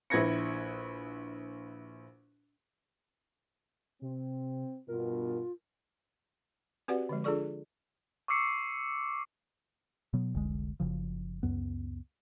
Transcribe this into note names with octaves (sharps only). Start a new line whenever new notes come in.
A#1 E4 B4 G#6 A#6 C#7
C3 C4
G2 B2 F4 A#4
C4 F#4 G4 B4 D5 F#5
D3 F3 G#3
D4 F4 G#4 A4 D5 C#6
C#6 D6 E6 C7 C#7
B2 F#3 B3
F1 C2 D3 G#3
F#1 C#3 F3
C#2 F#2 B3